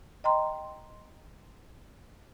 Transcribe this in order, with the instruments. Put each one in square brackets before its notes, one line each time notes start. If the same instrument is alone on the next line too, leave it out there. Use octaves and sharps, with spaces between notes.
[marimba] D#5 G5 A#5 C6